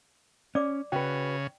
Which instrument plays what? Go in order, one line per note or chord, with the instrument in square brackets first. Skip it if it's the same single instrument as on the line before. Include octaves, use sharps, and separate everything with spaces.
[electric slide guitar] C#4 [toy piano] D5 D6
[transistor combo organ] C#3 [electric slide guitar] F#4 B4 [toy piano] G5